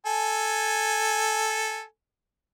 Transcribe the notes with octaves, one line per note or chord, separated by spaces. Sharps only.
A4 G#5